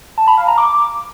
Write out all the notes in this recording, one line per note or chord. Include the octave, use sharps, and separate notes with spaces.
A5
B5
F5
A#5
D6